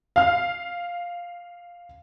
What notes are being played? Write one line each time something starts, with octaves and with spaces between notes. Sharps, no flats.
F5 F6